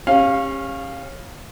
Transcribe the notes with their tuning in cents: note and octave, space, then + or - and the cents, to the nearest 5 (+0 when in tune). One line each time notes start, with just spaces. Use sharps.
C#4 -25 G4 +30 F5 +0